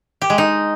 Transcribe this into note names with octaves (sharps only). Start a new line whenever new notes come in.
G4
G#3
D#4